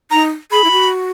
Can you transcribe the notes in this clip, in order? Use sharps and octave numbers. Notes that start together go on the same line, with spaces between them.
D#4 A#5
G#4 B5
E4
F#4